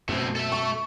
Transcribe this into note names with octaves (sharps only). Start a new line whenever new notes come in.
F#2 B2 A3 C4
A4 E5
C#6